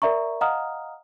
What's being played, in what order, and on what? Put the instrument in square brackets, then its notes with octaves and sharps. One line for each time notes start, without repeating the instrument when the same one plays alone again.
[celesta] A#4 D5 E5 A#5 C#6
D#5 F5 F#5 A#5 D#6 F6